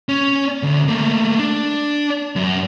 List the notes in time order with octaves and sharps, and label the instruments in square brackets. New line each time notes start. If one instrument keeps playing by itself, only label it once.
[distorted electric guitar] C#4
D2
A3 A#3
D4
F#2